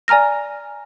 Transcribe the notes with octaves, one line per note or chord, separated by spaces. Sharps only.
D5 G#5 A#5 F6 A#6